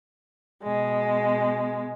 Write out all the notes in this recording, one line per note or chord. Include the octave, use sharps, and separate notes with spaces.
B2 G#3